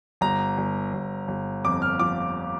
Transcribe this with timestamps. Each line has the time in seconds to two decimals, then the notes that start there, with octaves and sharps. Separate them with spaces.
0.21 G1 A#5
0.58 G1
0.93 G1
1.28 G1
1.64 F2 D6
1.82 F6
1.99 F3 D6